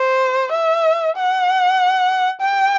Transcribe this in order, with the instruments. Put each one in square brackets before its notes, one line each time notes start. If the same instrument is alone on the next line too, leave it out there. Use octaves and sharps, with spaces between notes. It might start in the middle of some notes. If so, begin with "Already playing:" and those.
Already playing: [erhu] C5
E5
F#5
G5